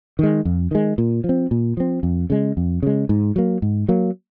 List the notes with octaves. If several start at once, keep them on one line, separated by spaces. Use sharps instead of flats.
D#3 G#3
F2
D#3 G#3
A#2
F3
C4
A#2
F3 C4
F2
C#3 G#3
F2
C#3 G#3
G#2
F#3 A#3
G#2
F#3 A#3